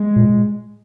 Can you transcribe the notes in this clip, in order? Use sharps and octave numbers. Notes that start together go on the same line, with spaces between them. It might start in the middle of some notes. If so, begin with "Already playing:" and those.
Already playing: G#3
A#2